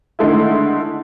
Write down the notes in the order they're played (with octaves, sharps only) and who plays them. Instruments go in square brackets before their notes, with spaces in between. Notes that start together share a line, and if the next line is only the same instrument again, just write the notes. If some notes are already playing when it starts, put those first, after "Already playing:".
[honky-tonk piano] D3 D#3 G#3 A3 E4